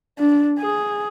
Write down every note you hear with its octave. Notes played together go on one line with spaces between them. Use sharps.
D4
G#4